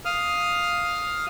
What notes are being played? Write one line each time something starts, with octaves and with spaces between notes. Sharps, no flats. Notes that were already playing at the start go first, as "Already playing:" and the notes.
F5 D#6 F6